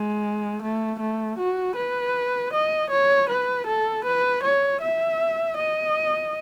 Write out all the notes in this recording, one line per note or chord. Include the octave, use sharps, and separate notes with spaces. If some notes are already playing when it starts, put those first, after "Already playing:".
Already playing: G#3
A3
A3
F#4
B4
D#5
C#5
B4
A4
B4
C#5
E5
D#5